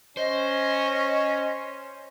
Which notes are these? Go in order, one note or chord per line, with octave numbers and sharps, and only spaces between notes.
C#4 C5 D#5